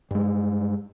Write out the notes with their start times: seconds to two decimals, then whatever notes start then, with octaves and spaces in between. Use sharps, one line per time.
0.11 G2 G#3